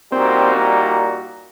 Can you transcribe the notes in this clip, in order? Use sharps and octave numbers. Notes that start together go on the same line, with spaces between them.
A#2 G3 A#3 C4 D#4 F#4